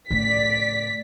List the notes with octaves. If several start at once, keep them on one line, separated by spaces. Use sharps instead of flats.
A2 C#3 D5 B6